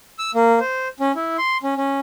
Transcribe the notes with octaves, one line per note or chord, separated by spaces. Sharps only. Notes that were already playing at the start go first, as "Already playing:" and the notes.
E6
A#3
C5
C#4
E4
C6
C#4
C#4